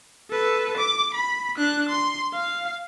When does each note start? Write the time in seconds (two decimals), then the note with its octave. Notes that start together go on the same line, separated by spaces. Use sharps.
0.30 A4 B4
0.77 D6
1.14 B5
1.57 D4 F#6
1.89 C6
2.33 F5